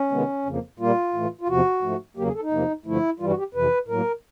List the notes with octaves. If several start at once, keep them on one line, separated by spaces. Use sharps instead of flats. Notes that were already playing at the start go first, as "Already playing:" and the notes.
Already playing: C#4
C3 D#3 G#3 B3
F2 C#3 F3 A#3
A#2 G3 A#3 F4
A2 E3 A3
F4
E2 C3 F3 F#4
G#2 F3 A3
E2 C#3 F#3 A#3 G4
G#4
A4
D#4
E2 C3 F3 A#3
G2 D3 F3 A3 E4
G2 E3 G3 F4
F#4
G4
F2 C3 E3 B4
A2 F#3 A#3 A#4